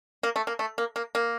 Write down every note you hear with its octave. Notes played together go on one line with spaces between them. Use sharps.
A#3
A3
A#3
A3
A#3
A#3
A#3